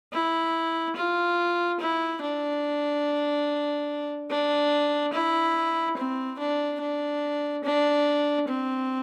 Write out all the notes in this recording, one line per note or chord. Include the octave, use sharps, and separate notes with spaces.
E4
F4
E4
D4
D4
E4
C4
D4
D4
D4
C4